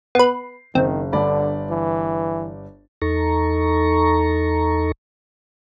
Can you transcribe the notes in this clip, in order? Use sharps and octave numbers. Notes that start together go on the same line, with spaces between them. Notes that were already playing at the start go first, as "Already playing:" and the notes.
B3 B4 C7
F#1 D#3 C4
G1 D3 D5 B5
E3
E2 D#4 A4 A#5 C#6